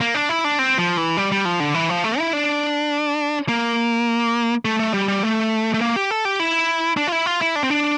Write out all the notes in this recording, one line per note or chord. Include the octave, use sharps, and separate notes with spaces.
A#3
D4
E4
D4
C4
F3
E3
G3
G3
F3
D3
E3
F3
A3
E4
D4
A#3
A3
A3
G3
G3
A3
A3
A#3
G4
A4
G4
E4
D4
F4
E4
F4
E4
D4
C4
D4